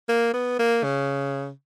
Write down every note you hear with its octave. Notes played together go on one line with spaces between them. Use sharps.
A#3
B3
A#3
C#3